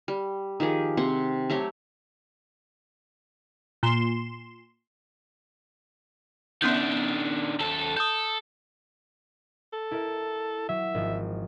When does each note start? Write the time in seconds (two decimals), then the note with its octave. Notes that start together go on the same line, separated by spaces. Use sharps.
0.08 G3
0.60 D#3 F3 G4 G#4
0.97 C3 C4 F#5 C6
1.50 F#3 A3 G4 C#5
3.83 A#2 C6 E7
6.62 D#3 B3 C#4 D4 G6
7.60 D#2 A4
7.97 A4 D#6 G6
9.73 A4
9.91 E4 A#4 E5
10.69 F#3 E5
10.95 G#1 F3